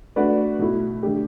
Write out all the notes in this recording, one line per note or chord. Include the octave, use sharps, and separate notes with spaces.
A3 D4 F#4 B4 D5
B2 A3 E4
D3 A3 D4 G4